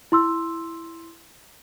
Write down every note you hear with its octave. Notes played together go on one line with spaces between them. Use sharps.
E4 C6 E6